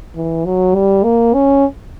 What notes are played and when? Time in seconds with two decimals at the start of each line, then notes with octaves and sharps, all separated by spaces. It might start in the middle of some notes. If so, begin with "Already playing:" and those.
0.16 E3
0.46 F#3
0.75 G3
1.04 A#3
1.34 C#4